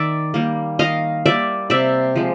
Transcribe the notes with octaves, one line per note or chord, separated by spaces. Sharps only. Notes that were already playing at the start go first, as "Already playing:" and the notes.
Already playing: D#3 D5 E5
G3 A#3
D#3 D#5 F5
G3 A#3 D5 E5
C3 D5 E5
F3 G#3